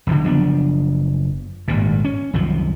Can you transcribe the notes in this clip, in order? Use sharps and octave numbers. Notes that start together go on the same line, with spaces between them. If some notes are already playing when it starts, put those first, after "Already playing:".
F#1 E2 G2 D3
F#1 F3 B3 D4
G#1 G2 A#2
C#4
C2 F#2 D#3 F3